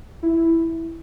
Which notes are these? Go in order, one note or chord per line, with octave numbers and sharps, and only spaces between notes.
E4